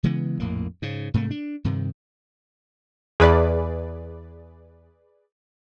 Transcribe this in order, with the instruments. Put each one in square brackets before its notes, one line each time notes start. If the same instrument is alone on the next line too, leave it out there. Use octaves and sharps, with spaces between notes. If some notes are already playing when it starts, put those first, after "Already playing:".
[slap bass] C#3 E3 G#3 B3
A#1 F2 A2 A#3
G#2 C#3
G#2 C3 A3 A#3
D4
G2 C3 D#3
[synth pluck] E2 [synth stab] G#4 B4 D5